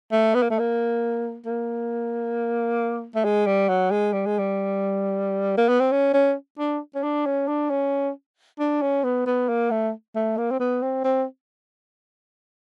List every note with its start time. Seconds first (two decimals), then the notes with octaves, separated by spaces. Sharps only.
0.12 A3
0.35 B3
0.43 A#3
0.51 A3
0.59 A#3
1.46 A#3
3.15 A3
3.24 G#3
3.47 G3
3.69 F#3
3.91 G#3
4.14 G3
4.26 G#3
4.39 G3
5.58 A#3
5.69 B3
5.80 C4
5.92 C#4
6.14 C#4
6.59 D4
6.95 C#4
7.03 D4
7.26 C#4
7.48 D4
7.70 C#4
8.59 D4
8.82 C#4
9.04 B3
9.26 B3
9.49 A#3
9.71 A3
10.16 A3
10.38 A#3
10.51 C4
10.60 B3
10.82 C4
11.04 C4